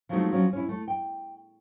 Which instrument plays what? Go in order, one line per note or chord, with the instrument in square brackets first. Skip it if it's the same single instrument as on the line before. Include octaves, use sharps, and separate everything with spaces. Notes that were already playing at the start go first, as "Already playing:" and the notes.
[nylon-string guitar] F3 F#3 G#3 A3 C4 D#4
F3 F#3 C4 C#4
C#4 E4
A3
G5